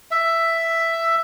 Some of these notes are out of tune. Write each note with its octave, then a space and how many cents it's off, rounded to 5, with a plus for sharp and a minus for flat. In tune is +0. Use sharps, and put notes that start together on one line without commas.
E5 +5